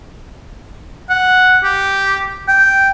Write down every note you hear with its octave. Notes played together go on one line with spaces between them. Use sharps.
F#5
G4
G5